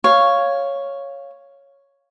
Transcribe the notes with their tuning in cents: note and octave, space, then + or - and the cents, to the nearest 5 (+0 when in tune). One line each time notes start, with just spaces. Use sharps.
C#5 +0 F5 +0